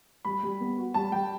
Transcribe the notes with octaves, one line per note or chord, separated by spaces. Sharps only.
G3 B5
G3
B3
F#4
G3 A5
G3 G5